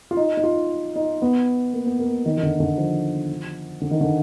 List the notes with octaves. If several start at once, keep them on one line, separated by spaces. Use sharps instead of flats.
F4
D#4
D#4
F4
D#4
B3
A#3
B3
A#3
D#3
D#3
D3
D3
F3
D3
D#3
D3